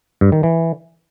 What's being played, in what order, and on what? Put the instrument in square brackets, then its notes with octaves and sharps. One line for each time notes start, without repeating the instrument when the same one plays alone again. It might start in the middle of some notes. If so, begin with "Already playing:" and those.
[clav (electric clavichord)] G2
D#3
E3